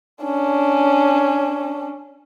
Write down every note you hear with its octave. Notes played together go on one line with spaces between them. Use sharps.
C#4 D4